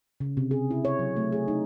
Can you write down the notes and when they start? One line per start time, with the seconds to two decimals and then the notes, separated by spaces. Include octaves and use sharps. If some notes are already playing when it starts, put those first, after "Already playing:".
0.20 C#3
0.37 C3
0.51 G#4
0.71 E4
0.85 C#5
0.99 F#3
1.16 A3
1.32 G#4
1.48 D#4